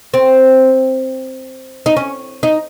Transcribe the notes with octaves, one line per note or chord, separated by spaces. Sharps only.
C4
D#4
C#4
D#4